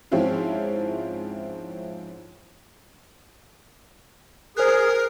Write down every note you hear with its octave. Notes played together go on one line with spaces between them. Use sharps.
G#2 F3 C4 C#4 E4 F4
G#4 A#4 C5 F#6